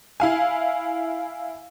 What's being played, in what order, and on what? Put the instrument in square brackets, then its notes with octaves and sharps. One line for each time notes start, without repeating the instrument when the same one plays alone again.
[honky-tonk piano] E4 F5 G#5